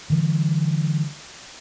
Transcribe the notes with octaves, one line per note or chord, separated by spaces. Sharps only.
D3 E3 G3